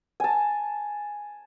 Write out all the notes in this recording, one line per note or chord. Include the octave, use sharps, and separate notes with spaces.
G#5 A5